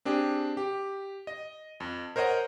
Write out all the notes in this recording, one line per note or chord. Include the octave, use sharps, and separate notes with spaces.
C4 D4 G4 G#4
G4
D#5
F2
A#4 C5 C#5 D#5 F#5